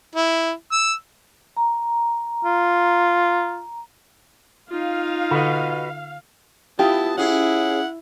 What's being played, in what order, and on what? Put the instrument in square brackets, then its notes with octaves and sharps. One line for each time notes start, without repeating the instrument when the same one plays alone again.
[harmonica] E4
E6
[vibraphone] A#5
[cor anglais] F4
[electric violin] D#4 F4 [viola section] F5
[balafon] D3 [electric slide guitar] F#4 B4 D#5
[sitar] B3 [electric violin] E4 [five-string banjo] F4 G4 [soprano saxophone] A5
[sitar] C#4 G#4 [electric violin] E4 [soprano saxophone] F#5